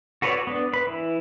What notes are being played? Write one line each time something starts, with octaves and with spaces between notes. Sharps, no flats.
F#4 A4 B4 C#5 D5
B3 D4
B4 B5
E3